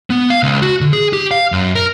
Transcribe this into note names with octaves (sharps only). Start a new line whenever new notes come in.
B3
F5
C#2
F#4
D3
G#4
G4
F5
F#2
A#4